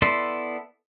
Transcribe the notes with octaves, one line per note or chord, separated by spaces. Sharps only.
B3 E4 A4 D5 C6